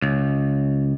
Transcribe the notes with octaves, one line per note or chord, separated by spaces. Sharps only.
C#2